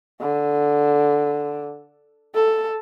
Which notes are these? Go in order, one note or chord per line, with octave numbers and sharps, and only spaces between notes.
D3
A4